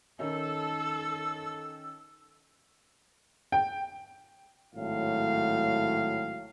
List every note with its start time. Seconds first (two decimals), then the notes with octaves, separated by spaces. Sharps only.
0.19 D#3 C#4 D#4 A4 E6
3.52 G5
4.75 G#1 A2 F#3 F5